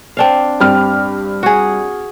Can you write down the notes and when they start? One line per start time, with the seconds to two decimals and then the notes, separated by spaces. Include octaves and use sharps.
0.17 C4 D4 F5
0.60 G2 C4 G4 F6
1.43 F#4 G#4